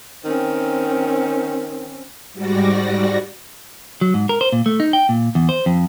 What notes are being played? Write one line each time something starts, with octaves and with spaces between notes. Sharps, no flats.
D#3 C4 C#4
G#2 G3 F#4 D5 A#6
F#3
G#2
A#4
C5
A#2
A3
D#4
G5
A#2
E2
C5
F2